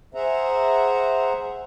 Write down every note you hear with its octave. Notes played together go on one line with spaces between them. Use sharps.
G#4 C5 E5 F#5 A#5